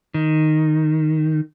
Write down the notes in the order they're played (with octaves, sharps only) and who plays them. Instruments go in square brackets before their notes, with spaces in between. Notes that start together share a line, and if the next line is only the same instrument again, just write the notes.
[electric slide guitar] D#3